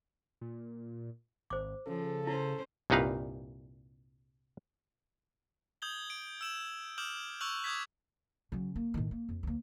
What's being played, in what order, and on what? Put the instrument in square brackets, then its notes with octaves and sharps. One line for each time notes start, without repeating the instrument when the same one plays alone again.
[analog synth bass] A#2
[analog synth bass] G#1 [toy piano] C5 D6
[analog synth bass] C#3 [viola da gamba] F3 [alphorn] A4
[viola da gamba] C#4 C5 [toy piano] E4
[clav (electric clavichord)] C2 G2 A#2 D#4 B4 F5
[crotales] D#6 G6 G#6 F#7 G7
D7
E6 E7 F#7
D6 D#6 F6 G6 E7 F#7
C#6 E6 F#6 F7 F#7
D6 D#6 G6 G#6 B6
[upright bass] C#3 F#3
A#3
A2 D#3
A#3
F2
D2 A#3